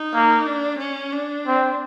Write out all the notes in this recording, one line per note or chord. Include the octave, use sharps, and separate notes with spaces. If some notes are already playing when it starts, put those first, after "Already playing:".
Already playing: D#4
A#3
D4
C#4
D4
C4